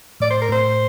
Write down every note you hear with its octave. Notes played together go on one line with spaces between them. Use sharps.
A2 D5
C5
A#4
A2 C5